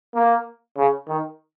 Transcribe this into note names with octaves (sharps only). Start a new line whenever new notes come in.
A#3
C#3
D#3